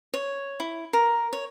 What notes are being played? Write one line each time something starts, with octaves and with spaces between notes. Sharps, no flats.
C#5
E4
A#4
C#5